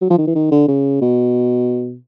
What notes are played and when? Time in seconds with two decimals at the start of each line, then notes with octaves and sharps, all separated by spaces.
0.01 F#3
0.10 F3
0.18 D#3
0.27 E3
0.35 D#3
0.51 D3
0.68 C#3
1.01 B2